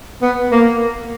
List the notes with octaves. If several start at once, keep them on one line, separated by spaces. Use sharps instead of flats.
B3
A#3